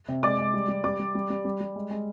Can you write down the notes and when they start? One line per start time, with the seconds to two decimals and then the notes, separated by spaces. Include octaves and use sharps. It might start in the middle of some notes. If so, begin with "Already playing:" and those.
0.08 C3
0.23 G#3 D5 D6
0.38 G#3
0.54 G3
0.68 G3
0.84 G3 D5 D6
0.99 G3
1.15 G3
1.30 G3
1.45 G3
1.60 G3
1.76 G#3
1.91 G#3